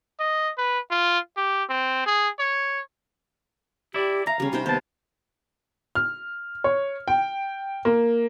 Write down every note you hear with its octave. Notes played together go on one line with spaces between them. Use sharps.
D#5
B4
F4
G4
C4
G#4
C#5
E4 G4 D5
E5 F5 A#5
C#3 G3 C#4
C3 D#4 C5 G5
D#2 B3 C5 A5
F6
C#5
G5
A#3